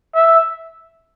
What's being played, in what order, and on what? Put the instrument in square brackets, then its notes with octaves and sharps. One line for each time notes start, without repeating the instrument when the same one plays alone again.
[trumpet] E5